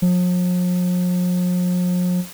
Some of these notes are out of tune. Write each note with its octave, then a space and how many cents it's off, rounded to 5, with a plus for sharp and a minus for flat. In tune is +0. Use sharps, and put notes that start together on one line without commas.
F3 +45